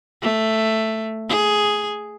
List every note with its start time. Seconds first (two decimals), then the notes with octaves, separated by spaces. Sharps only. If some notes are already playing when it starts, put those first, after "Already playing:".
0.22 A3
1.29 G#4